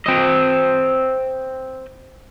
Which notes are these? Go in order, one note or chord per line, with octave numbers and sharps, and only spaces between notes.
C4 D#5